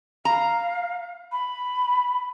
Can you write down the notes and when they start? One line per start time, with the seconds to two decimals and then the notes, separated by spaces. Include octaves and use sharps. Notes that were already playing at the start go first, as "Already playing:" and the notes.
0.25 F5 A#5
1.32 B5